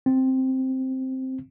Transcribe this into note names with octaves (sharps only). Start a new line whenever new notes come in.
C4